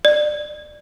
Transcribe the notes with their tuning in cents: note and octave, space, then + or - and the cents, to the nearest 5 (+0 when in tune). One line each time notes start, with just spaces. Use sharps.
D5 +30